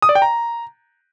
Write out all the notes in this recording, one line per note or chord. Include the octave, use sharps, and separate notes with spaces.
D#6
D5
G5
A#5